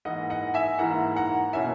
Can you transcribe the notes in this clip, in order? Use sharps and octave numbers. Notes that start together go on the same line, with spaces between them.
G#2 E3 A#3 E4 D#5 F#5
D#5 F#5
E5 G#5
G#2 E3 A#3 E4 F#5 A#5
F#5 A#5
B2 A#3 C#4 E4 E5 G#5